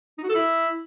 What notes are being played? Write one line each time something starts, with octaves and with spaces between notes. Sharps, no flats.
D#4
F#4
A4
E4